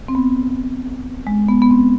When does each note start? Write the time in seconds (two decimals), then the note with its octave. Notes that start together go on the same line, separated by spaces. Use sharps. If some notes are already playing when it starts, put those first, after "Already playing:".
0.08 C4
0.15 B3
1.27 G#3
1.48 B3
1.62 B3
1.71 C4